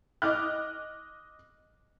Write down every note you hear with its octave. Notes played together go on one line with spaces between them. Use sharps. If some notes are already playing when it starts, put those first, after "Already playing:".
D#5 D6 F6 F#6